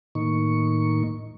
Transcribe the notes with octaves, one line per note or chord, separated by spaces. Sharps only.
A2 D#3 A#3 D#4 C#6